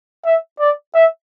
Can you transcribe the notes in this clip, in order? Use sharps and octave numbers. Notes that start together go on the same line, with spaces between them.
E5
D5
E5